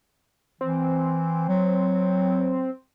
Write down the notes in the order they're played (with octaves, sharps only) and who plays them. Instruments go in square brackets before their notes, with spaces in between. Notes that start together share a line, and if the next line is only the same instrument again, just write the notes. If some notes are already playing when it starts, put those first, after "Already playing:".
[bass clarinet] E3 [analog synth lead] C4
[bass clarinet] F#3